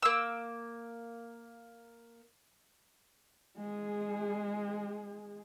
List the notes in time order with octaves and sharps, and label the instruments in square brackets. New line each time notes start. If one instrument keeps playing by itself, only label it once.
[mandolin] A#3 E6
[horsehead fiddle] G#3 G#4